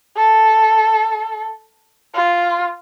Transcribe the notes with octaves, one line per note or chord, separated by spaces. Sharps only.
A4
F4